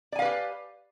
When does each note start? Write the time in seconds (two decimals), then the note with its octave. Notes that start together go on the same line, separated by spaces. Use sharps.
0.12 D5
0.16 G#5
0.19 F5
0.22 B4
0.25 G4